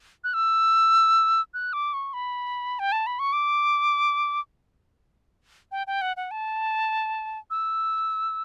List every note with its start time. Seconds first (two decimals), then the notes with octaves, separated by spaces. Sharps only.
0.24 F#6
0.34 E6
1.54 F#6
1.73 D6
1.93 C#6
2.13 B5
2.79 G5
2.92 A5
3.07 B5
3.19 C#6
3.33 D6
5.72 G5
5.87 G5
6.02 F#5
6.17 F#5
6.31 A5
7.51 E6